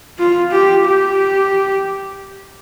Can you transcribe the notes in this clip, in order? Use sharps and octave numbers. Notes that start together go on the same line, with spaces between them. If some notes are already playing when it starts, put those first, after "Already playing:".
F4
G4
G4